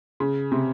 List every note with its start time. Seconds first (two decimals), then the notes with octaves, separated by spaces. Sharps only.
0.20 C#3
0.52 C3